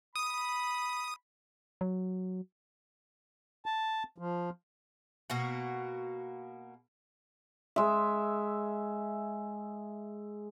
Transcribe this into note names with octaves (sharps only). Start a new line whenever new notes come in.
B5 D#6
F#3
A5
F3
B2 A#3 F#4
G#3 E5